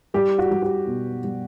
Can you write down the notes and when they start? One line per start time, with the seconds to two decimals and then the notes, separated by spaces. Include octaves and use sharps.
0.14 G3 G4
0.38 F#4
0.51 G3
0.62 G4
0.87 B2
1.24 G3